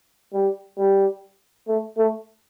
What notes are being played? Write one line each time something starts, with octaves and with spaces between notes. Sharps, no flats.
G3
G3
A3
A3